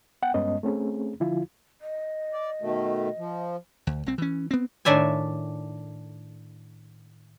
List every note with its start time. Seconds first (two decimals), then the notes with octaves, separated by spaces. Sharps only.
0.22 B3 F#5 G5
0.34 G2 G#3 B3 C#4 D#5
0.63 A3 C4 C#4 G#4
1.20 D3 F3 E4 F4
1.81 D#5
2.33 D5
2.62 B2 D#3 A3
3.18 F3
3.87 D2
4.06 C2 C4
4.18 E3 C#4
4.51 B3 C4
4.85 A2 D#3 D4 E5 G#5